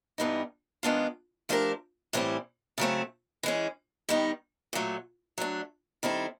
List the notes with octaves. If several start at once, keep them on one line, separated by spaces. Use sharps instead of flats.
G2 E3 G3 B3 D#4
D#3 G#3 B3 D4 F4
F3 A3 D4 G4 A#4
A2 E3 G3 C4
C#3 F#3 A3 C4
E3 G#3 C#4
D#3 G3 B3 D#4
A#2 F#3 A3
F#3 A3 D4
D#3 G3 C4 E4 A4